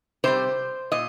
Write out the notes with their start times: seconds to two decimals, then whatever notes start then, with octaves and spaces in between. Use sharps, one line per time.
0.24 C3 G3 C5
0.92 A#2 D#5